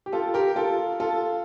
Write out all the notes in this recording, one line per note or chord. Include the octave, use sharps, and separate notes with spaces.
G4
F4 A4
G4 A#4
F4 A4
F4 A4